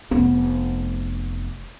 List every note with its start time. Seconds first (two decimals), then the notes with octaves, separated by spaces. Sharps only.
0.11 F1 B3